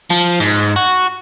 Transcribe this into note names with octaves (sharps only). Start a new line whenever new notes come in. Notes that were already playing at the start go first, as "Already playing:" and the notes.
F3
G#2
F#4